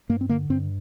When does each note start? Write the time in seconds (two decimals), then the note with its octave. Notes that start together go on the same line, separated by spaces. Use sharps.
0.09 G2 A#3
0.21 C4
0.29 D3 A#3
0.50 G2 C4